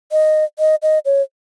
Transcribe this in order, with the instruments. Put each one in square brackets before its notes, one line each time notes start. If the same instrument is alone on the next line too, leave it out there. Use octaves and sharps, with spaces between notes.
[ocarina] D#5
D#5
D#5
C#5